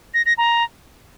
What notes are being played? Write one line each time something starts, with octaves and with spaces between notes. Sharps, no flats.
A#6
A#6
A#5